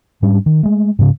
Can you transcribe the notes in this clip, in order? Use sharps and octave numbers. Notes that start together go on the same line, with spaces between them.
G#2 G3 C#4 D4
D#3
G#3 A3
G#2 C#3